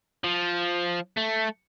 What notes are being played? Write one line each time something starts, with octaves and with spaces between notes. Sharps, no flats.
F3
A3